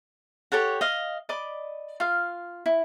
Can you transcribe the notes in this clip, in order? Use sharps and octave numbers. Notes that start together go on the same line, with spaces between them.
G4 A4 C#5 F#5
D#5 F5
D5 D#5 B5 D6
F4 F5
E4